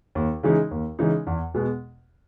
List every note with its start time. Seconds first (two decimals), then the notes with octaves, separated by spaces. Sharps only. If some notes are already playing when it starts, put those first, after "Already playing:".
0.15 D#2
0.43 C#3 E3 G#3 D#4
0.71 D#2
0.99 C#3 E3 G#3 D#4
1.27 E2
1.54 B2 G#3 B3